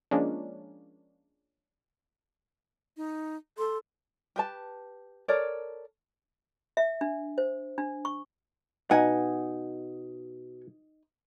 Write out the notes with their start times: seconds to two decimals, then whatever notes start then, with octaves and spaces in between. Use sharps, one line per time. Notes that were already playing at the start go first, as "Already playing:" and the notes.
0.11 F3 G#3 A#3 C#4 D4
2.97 D#4
3.58 A4 C6
4.36 G4 B4 A5
5.28 A4 A#4 C#5 D5
6.77 E5
7.01 D4
7.38 C5
7.78 D4
8.05 C#6
8.91 B2 D#4 F#5 G#5